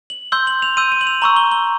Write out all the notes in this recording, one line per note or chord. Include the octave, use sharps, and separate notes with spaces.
F#7
C6 E6 G6 G7
F#7
F7
C6 E6 G6 D#7
D#7
F#7
F7
A#5 C#6 E6 F#7
G7
G7